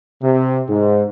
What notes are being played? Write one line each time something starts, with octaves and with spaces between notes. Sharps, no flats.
C3
G#2